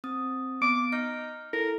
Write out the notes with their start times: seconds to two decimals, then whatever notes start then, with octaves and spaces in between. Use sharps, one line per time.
0.04 C4 D#6
0.61 B3 D6
0.92 D#4 F6
1.53 E4 A4 A#4